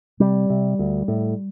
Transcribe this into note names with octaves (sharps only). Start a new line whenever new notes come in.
C3 G3
C3
D2
A2